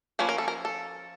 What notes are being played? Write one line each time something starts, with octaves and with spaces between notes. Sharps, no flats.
F3 A#3 C#4 B4
A#4
A4
A#4
A4